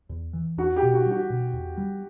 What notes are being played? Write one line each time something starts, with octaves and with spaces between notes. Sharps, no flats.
E2
E3
E2 F#4
G4
B2
F#4
G3 F#4
B2
E2
G3